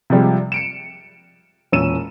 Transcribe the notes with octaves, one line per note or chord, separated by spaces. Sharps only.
C3 F3 G3 G#3
C#7 D7 E7
E1 A#2 C#4 E6 D#7 E7